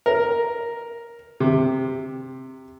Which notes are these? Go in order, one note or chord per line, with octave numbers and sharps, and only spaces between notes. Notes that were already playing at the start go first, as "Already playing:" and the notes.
A#4
C3